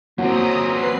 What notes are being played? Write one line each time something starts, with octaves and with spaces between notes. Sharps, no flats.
F#2 F#3 A#3 C4 A#5 D#6
B4 C7